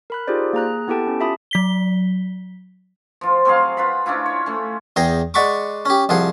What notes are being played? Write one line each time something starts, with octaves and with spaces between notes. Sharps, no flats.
A#4 B5 F#6
D#4 F4 G4 G#4 C5 D5
A#3 G#4 A#5 F#6
B3 E4 G4 A4 G5 A5
C#4
F4 G4 E5 A5 B5 D#6
F#3 B6 G7
F3 F4
F#3 C4 G#4 F5
F4 B4 F#5 B5
C#4 D4 E4 F4
C#5
A3 C#4
E2 G#4 G5 A#5
G#3 D5 F#5 B5 C#6 D6
C#4 G4
C2 F3 G#4 F#5